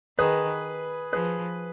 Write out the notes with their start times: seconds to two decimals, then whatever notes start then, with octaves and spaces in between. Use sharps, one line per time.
0.18 D#3 G#4 B4
1.13 F3 G#4 B4